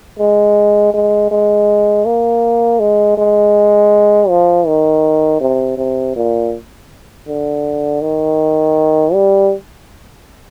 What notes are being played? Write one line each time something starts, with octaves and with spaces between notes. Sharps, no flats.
G#3
G#3
G#3
A#3
G#3
G#3
F3
D#3
C3
C3
A#2
D3
D#3
G3